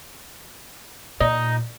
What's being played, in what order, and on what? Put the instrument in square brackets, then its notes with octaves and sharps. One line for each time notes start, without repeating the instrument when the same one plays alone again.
[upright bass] A#2 [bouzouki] D#4